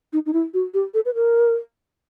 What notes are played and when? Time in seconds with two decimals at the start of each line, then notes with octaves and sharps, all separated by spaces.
0.13 D#4
0.26 D#4
0.33 E4
0.54 F#4
0.74 G4
0.94 A4
1.05 B4
1.15 A#4